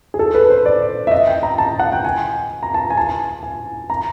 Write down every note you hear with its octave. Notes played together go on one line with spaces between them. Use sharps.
G#4
A4
B4
C5
D5
E5
D#5
G5
A#5
A5
F#5
G5
G#5
A#5
A5
G#5
A5
G#5
A#5